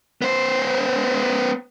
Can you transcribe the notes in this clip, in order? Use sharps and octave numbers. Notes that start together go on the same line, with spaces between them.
B3 C5